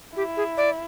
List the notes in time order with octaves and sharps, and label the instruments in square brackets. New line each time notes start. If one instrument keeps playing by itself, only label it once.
[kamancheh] E4 [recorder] G4
[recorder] G#4
D5